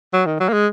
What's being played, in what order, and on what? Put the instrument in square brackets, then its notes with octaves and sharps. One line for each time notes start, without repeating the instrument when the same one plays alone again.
[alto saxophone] F#3
D#3
F#3
A#3
G#3